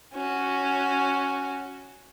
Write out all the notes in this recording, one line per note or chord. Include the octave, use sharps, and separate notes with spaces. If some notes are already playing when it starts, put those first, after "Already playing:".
C#4 F#4